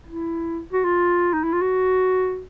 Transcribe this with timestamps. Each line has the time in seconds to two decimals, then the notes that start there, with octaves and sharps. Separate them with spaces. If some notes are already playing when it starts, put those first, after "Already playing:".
0.06 E4
0.73 F#4
0.85 F4
1.33 D#4
1.43 E4
1.52 F4
1.62 F#4